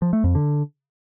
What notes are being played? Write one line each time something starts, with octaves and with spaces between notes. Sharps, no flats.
F3
A3
F2
D3